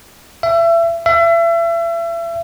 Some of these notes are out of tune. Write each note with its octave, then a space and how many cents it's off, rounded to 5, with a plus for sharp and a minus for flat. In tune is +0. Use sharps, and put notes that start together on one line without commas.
E5 +30
E5 +35